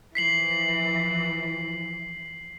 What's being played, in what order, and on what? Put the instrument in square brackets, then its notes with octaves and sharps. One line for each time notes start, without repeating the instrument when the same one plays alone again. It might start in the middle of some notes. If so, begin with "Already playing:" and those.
[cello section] E3 F3 [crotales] B6 C7 F#7